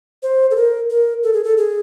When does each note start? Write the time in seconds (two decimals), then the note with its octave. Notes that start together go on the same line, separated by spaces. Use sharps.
0.23 C5
0.51 A4
0.56 A#4
0.90 A#4
1.23 A4
1.33 G#4
1.44 A4
1.57 G#4